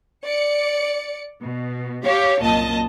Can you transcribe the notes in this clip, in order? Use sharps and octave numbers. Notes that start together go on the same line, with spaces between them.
D5 C#7
B2
G4 C#5 F5
C2 F#2 A#2 D#5 A5